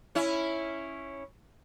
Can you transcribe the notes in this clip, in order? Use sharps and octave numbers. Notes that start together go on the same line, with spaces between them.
C#4 E4